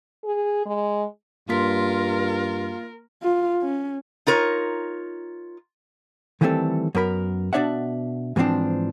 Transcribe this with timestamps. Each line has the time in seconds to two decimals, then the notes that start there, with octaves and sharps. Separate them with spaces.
0.24 G#4
0.65 G#3
1.49 G2 A#3 F4 A#4 C6 B6
3.23 F4
3.62 C#4
4.27 D#4 F4 A#4 C#5
6.41 D#3 E3 G3 A3 C4 A4
6.95 F#2 B3 A#4 B5
7.53 B2 A#3 D4 D5 E5 F#5
8.36 G#2 E3 F3 A#3 C4 D4